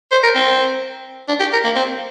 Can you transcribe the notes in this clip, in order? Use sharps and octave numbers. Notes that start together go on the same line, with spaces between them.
C5
A#4
C4
D4
G4
A#4
A#3
C4